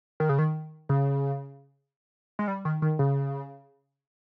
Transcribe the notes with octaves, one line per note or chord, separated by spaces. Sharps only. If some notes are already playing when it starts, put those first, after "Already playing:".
D#3
C#3
D#3
C#3
G#3
G3
D#3
D#3
C#3